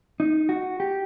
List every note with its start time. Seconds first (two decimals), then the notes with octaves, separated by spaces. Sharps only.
0.20 D#4
0.49 F#4
0.80 G4